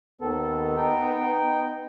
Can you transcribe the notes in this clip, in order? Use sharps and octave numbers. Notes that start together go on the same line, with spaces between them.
D#2 D#3 B3 A4
D#4 G5